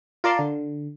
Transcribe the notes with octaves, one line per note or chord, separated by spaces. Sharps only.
F4 A#4 D5 A5 C6
D3